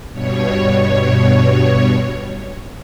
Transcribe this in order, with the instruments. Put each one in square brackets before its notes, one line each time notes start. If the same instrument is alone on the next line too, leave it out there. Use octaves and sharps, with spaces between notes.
[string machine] G2 B2 C#5